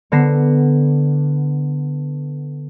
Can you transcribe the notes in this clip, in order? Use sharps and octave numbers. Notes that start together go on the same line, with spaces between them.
D3 B3 A#6 C7 E7